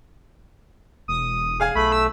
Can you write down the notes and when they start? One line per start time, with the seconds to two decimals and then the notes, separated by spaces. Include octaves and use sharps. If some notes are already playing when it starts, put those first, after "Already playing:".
1.08 E1 D#6
1.60 G#4 F5 G#5
1.75 B1 A3 B5
1.92 E6